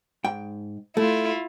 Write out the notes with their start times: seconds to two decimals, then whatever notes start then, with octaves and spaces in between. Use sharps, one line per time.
0.24 G#2 G5
0.97 A3 E4 F4